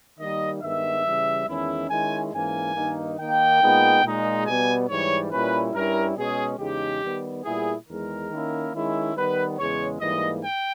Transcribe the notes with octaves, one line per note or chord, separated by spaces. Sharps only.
D#3 G3 A#3 D#4 D#5
G2 D#3 G#3 B3 E5
C#3 E3 G3
E2 D#3 G#3 C#4 E4
D#3 G#3 C#4 E4 G#5
G#2 E3 A#3 C#4 G#5
G2 D#3 A#3 D#4
D#3 A#3 D#4 G5
A#2 G#3 B3 D#4
A#2 G#3 D#4
B2 G3 B3 G#5
G#2 E3 G3 C#5
A#2 G3 C#4 E4 B4
G2 G3 C#4 E4 A#4
B2 G#3 C#4 G#4
E2 C#3 G#3 D#4 G4
D#3 G3 B3
A#2 G3 B3 E4 G#4
E2 D#3 G#3 A#4
D#3 A#3 C#4 E4
D#3 G#3 C#4 E4
D#3 G3 B3 B4
E2 C#3 G#3 C#5
G#2 E3 G3 A#3 D#5
G5